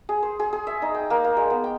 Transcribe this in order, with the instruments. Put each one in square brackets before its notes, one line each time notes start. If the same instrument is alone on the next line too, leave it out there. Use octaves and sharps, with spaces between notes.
[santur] G#4
C5
G#4
G#4
E5
D#4
G5
A#3
A#3
G#3
B3
G5